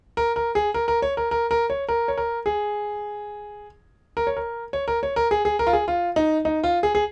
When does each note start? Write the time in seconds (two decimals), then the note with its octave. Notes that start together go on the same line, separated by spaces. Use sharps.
0.17 A#4
0.36 A#4
0.55 G#4
0.74 A#4
0.88 A#4
1.02 C#5
1.17 A#4
1.31 A#4
1.51 A#4
1.70 C#5
1.89 A#4
2.08 C#5
2.18 A#4
2.46 G#4
4.17 A#4
4.27 C#5
4.37 A#4
4.73 C#5
4.88 A#4
5.03 C#5
5.16 A#4
5.31 G#4
5.45 G#4
5.59 A#4
5.67 F4
5.73 G#4
5.88 F4
6.16 D#4
6.45 D#4
6.63 F4
6.83 G#4
6.95 G#4